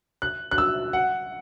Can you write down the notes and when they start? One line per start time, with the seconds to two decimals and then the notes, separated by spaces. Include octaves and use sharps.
0.22 F#6
0.51 F#6
0.58 E6
0.93 F#5